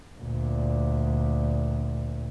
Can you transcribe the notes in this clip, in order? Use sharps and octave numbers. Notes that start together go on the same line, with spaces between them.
D2 A#2